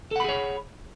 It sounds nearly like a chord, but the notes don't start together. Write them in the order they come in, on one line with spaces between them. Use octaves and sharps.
A4 F#5 B5 G#4 C#5